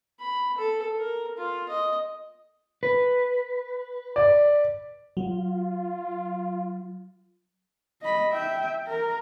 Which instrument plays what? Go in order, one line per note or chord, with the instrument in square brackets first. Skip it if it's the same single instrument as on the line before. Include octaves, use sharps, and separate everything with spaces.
[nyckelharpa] B5
A4
A#4
F4
D#5
[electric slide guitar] B4
[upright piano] D5
[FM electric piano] F#3 [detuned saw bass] F4
[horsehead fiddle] D#5 B5
E5 G5
A#4